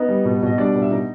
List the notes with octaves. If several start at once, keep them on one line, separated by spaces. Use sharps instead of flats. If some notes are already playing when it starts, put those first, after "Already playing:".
Already playing: B3 D#4 D#5
G3
B2
B2 D#5
G3 D4 D5
B2
E5
B2 D#4 D#5